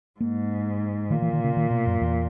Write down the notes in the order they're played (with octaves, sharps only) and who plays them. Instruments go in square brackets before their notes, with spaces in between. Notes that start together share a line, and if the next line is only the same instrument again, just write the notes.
[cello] G#2 [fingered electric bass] A#3
[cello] A#2 [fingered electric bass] D#3
[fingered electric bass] E3
D#3
C#3
D#3
B2
F#2
E2